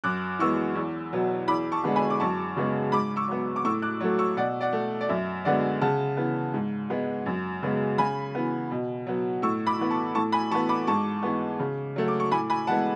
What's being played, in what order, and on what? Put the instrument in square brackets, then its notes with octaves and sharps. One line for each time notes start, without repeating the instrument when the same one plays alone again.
[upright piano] F#2 D6 F#6
E3 G#3 B3 C#6 E6
E2
B2 F#3 B3
E2 B5 D6
A5 C#6
D3 G#3 B3
G#5 B5
D6
F#2 A5 C#6
C#3 G#3 B3
G#2 B5 D6
C#6 E6
F#3 B3
D6
A2 C#6 E6
D6 F#6
F#3 A3
C#6 E6
B2 D5 F#5
D5 F#5
A3
D5
F#2 E5
D3 G#3 B3 D5 F#5
C#3 F#5 A5
E3 B3
G#2
G#3 B3
F#2
C#3 G#3 B3
C#3 G#5 B5
E3 B3
B2
F#3 B3
A2 C#6 E6
B5 D6
E3 B3
A5 C#6
A2 A5 C#6
G#5 B5
E3 B3 A5 C#6
B5 D6
G#2 A5 C#6
E3 G#3 B3
C#3
F#3 A3
D6
C#6
A2 G#5 B5
G#5 B5
E3 G#3 B3 F#5 A5